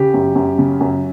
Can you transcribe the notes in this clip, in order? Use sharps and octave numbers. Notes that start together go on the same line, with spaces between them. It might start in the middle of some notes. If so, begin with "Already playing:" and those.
Already playing: C#3 G4
F#2
F#2
C#3
F#2